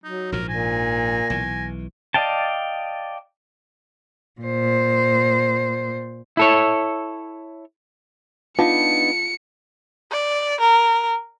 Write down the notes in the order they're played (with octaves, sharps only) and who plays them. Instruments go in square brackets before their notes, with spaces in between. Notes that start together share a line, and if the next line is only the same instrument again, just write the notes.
[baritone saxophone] F#3 [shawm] D#4
[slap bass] A#1 G#2 F3 [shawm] A#4
[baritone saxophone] A#2 [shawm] G#5 [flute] A#6
[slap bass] B1 E3 [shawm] G#5
[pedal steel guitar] D5 D#5 F5 G5 A5
[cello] A#2 C5
[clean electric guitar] E4 A4 C#5
[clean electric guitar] B3 D4 D#4 [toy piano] F4 F5 A5 [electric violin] C#7
[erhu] D5
A#4